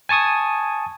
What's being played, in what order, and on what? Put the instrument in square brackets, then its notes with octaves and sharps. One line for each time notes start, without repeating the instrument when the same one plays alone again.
[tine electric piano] G#5 A5 C#6 D#6 G#6